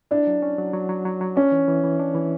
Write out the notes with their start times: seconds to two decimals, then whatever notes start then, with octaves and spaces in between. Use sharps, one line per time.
0.11 D4 E4
0.27 F#3
0.42 C#4
0.58 F#3
0.73 F#3
0.89 F#3
1.05 F#3
1.21 F#3
1.36 C#4 D4
1.52 E3
1.68 E3
1.84 E3
2.00 D4
2.15 E3